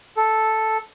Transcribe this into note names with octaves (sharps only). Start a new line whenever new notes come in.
A4